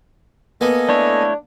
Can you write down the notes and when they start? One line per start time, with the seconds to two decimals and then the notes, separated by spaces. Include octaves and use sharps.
0.61 A#3 B3 A4 D#5 G#5
0.89 A3 D4 E4 C#5